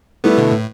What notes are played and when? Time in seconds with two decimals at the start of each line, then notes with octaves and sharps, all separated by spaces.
0.24 G3 A3 B3 E4 B4
0.38 B2 D3
0.51 A2